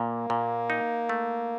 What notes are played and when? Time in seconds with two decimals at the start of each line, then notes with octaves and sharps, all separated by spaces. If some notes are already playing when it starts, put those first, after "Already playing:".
Already playing: A#2 A#3
0.30 A#2
0.70 D#4
1.09 A3